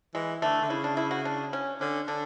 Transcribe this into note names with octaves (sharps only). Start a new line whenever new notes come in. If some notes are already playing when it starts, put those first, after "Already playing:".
E3 G#3
D3 A3
D3
C#3 E4
D4
E4
F#4
D4
C#4
D3 C#4
D3 D4